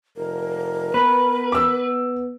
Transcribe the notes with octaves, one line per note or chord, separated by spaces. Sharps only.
F1 A#4
B3 B4
D6 E6